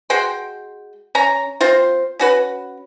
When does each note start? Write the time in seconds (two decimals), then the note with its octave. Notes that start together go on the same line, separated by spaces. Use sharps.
0.10 G#3 F#4 G5 C6
1.15 C#4 A#5
1.61 C4 F4 C5
2.19 C#4 F#4 B4